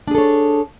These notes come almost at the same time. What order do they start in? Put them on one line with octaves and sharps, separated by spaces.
D4 G#4 A4 C#5